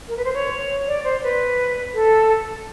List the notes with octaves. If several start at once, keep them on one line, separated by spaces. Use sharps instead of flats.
A#4
B4
C5
C#5
D5
C5
B4
A4